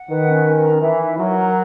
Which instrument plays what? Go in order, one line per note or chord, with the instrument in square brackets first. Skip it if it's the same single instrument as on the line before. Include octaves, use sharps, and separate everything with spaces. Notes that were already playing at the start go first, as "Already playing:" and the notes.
Already playing: [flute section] F#5
[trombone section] D#3 [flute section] B4
[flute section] C#4
A#4
A#5
[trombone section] E3 [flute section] E5
[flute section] D#4
[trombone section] F#3 [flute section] A#4
[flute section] A#5